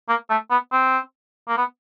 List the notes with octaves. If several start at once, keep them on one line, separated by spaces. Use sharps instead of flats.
A#3
A3
B3
C4
A#3
B3